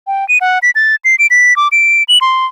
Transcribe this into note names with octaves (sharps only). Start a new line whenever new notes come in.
G5
D#7
F#5
B6
A6
C7
D7
B6
D6
D7
F#7
C6